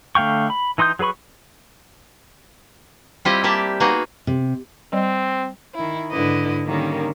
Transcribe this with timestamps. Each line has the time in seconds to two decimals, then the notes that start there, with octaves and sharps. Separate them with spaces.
0.15 D3 A3 F5 G5 C#6
0.50 B5
0.78 E3 D#4 C6 D#6 G6
0.99 F#3 G#4 B4 B5 C#6
3.25 G3 C4 E4 F4 G4 D#5
3.44 A#3 G4 D5 E5 A5
3.80 A#3 B3 D#4 F#4 G#4
4.27 C3
4.93 G3 C4 D5
5.74 D#3 E4
6.11 G#2 D3 E4 B4 D#5
6.65 D3 D#3 G3 A#3 C#4